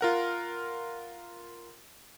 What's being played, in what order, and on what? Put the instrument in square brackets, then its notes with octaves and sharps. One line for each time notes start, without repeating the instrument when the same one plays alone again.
[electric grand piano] F4 A#4 F#5